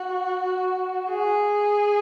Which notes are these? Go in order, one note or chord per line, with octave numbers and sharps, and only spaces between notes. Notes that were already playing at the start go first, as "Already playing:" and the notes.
Already playing: F#4
G#4